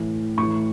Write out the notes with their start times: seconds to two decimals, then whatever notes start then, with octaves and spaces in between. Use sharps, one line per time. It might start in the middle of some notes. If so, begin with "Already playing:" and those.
Already playing: A2 E3
0.38 A2 C#6
0.42 E3